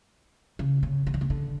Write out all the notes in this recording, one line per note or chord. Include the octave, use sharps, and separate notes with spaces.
C#3
C#3
C#3
D3
C#3
D3